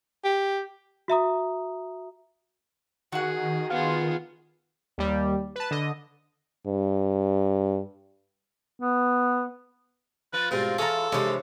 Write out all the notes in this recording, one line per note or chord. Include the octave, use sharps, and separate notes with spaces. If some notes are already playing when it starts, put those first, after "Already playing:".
G4
F#4 E5 A#5 D#6
D#3 F#4 G#4 F#5
B3 F4 G#4
D#2 G3
B4 A5
D3 D#5
G2
B3
F3 F4 B4
G#2 B2 G3 C4 F4 A#4
E3 F4 G#4 A4 C#5 A#5
C3 E3 F3 G#3 D4 D#4 C#5